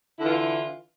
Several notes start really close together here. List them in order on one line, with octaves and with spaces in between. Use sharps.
E4 D3 E3 F4